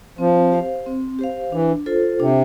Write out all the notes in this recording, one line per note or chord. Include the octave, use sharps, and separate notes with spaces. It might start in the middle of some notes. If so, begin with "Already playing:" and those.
F3 C4
G4 C5 F5
C4
G4 C5 F5
E3 D4
F4 A4 C5
C3 D4